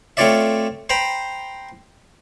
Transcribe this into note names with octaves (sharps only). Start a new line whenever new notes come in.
A3 C4 F4 C#5 D5 E5
C5 G5 A#5 B5